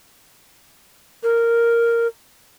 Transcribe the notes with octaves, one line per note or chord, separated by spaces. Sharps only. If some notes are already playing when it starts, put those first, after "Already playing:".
A#4